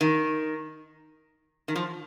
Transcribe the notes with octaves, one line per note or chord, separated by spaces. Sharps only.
D#3
D#3
F3